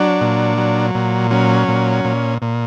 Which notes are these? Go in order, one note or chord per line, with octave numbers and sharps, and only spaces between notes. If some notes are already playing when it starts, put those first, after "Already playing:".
Already playing: F#3 D4
A#2
F#3
A#2
F#3 C#4
A#2
A#2
A#2